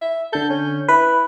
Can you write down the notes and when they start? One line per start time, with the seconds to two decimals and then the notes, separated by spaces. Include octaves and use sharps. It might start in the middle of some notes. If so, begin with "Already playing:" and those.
0.02 E5
0.33 D3 A4 G6
0.50 C#4
0.89 E4 B4 B5